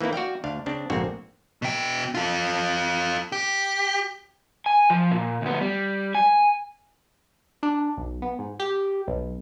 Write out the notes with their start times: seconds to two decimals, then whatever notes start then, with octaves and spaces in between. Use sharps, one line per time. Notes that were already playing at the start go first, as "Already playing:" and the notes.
0.01 E3 A#3 C4 D#4 E4
0.13 F#4 D5 F5 G5
0.44 D2 D4 F5
0.66 C#3 C4 D4
0.90 A#1 G#2 D3 A#3 C4 F#4
1.62 B2 G5
2.15 F4 A4
3.32 G4
4.66 G#5
4.90 F3
5.11 A#2
5.42 D2 B3
5.61 G3
6.15 G#5
7.63 D4
7.97 B1
8.22 B3
8.39 G#2
8.60 G4
9.07 B1